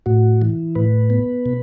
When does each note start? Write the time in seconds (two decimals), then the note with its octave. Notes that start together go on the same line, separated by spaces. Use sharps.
0.06 A2 F#4
0.42 E3
0.75 A2 B4
1.10 B3
1.46 B2